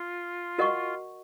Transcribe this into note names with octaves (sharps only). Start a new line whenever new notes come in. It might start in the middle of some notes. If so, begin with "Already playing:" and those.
Already playing: F4
F#4 A#4 D#5 F#5 C#6